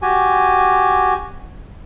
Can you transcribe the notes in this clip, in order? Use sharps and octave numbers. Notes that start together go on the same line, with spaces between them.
F#4 G4 G#5